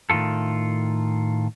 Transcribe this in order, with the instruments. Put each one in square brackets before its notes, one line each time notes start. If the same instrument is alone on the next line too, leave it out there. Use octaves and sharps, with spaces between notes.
[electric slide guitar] A2 D#3 E3 F4 A4